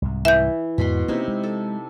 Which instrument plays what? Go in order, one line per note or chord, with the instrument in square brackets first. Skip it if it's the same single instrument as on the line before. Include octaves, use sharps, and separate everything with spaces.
[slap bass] C2 G#2
[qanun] E3 [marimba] E5 G6
[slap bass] E2 G#2 [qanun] B2 B5 C6
[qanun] C3 D#4 E4 [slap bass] A#3 C4 C#4
[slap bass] G#3
[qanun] A4